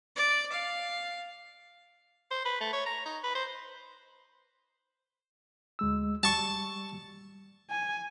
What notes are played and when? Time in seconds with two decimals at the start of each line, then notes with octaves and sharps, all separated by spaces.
0.16 D5
0.52 F5
2.31 C5
2.45 B4
2.60 A3
2.73 C#5
2.86 A#5
3.05 D#4
3.23 B4
3.35 C5
5.79 D2 G#3 E6
6.23 G3 A5 C#6
7.70 G#5